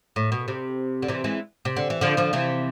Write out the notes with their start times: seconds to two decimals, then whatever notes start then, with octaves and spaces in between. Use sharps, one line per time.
0.16 A2
0.32 B2
0.48 C3
1.02 D3
1.08 C3 E3
1.24 E3 G#3
1.65 C3
1.76 D3
1.90 E3
2.01 D3 F3
2.17 D3 F3
2.33 C3 E3